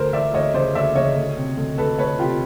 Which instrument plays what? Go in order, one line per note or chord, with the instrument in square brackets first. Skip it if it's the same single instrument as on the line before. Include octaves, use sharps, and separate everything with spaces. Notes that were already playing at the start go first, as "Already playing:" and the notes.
Already playing: [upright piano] D2 A#4 C5
D2 D5 E5
D2 C#5 D#5
C#3 C5 D5
D2 D5 E5
C#3 C#5 D#5
D2
C3
D2
D2 A4 B4
D2 B4 C#5
C3 F4 G4